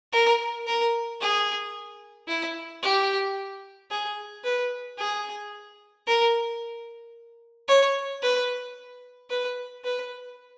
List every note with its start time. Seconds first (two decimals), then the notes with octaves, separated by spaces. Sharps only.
0.12 A#4
0.66 A#4
1.21 G#4
2.28 E4
2.82 G4
3.91 G#4
4.44 B4
4.98 G#4
6.07 A#4
7.68 C#5
8.22 B4
9.30 B4
9.84 B4